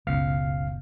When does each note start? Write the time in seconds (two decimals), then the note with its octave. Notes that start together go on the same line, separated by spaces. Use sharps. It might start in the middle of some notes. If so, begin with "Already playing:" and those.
0.07 F#1 C#2 B2 F5 F6